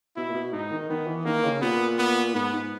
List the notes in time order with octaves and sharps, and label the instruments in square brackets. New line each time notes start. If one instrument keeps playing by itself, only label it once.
[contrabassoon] B2 [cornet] E4
[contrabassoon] A#2
B2
[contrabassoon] G#2 [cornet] D#4
[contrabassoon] D#3
[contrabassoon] D#3 [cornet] B3
[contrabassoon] E3
[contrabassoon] D#3 [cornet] A#3
[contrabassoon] C#3
[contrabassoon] A#2 [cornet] B3
[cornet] B3
[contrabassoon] G#2 [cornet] B3
[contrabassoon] G#2